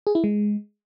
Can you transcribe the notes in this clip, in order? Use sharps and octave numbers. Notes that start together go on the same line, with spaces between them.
G#4
E4
G#3